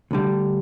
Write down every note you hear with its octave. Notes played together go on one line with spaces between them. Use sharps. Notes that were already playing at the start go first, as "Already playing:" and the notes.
D2 D3 G3